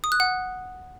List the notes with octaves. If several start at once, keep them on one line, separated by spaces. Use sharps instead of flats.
D#6
F#6
F#5